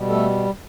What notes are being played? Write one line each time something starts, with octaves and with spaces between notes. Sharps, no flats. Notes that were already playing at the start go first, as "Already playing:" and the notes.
Already playing: B2 G3
A3 A4